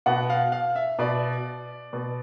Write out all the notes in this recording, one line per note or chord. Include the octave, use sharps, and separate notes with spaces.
B2 F#5
F5
F5
E5
B2 D5
B2